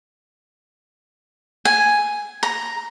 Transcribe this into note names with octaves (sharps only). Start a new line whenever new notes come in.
G#5
A#5